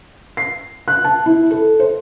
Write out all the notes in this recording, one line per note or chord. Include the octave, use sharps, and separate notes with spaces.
C7
F#6
A5
E4
A4
C5